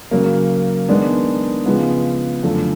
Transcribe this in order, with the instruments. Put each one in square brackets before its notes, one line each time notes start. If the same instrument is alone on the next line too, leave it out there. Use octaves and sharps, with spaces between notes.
[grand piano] C#3 F#3 A#3
D#3 G#3 B3 D4
C#3 F3 G#3 B3
F#2 D3 F3 A3